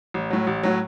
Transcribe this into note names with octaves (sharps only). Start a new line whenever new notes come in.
A1
A2 F#3
A1
A2 F#3